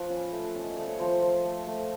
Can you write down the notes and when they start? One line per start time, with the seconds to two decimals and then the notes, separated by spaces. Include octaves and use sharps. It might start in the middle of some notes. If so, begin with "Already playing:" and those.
Already playing: F3 B4
0.10 C#4
0.32 A3
0.55 C#4
0.62 D#5
0.74 A3 D5
0.87 C#5
0.99 F3 C5
1.22 F3
1.45 A3
1.67 A3